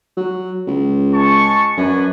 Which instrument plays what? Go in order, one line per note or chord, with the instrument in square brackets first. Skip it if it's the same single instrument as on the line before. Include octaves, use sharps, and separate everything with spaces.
[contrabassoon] F#3
C#2
[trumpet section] G#3 A5 C#6
[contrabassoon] F#2 [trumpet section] B4 D5 G#5